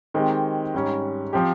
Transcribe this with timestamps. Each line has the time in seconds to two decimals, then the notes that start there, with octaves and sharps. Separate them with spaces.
0.14 D#3 G#3 C4 G4
0.74 G#2 G3 C#4
1.33 F3 C4 G4